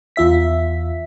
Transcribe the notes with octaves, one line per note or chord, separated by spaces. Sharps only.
E2 F4 E5 B6